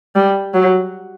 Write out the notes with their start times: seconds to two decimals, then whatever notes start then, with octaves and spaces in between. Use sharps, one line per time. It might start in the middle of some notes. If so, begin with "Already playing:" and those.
0.15 G3
0.53 F#3